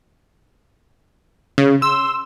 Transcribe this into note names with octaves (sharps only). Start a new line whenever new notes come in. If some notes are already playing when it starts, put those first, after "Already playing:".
C#3
C6 E6